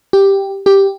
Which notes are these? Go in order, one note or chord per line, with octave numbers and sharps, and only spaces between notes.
G4
G4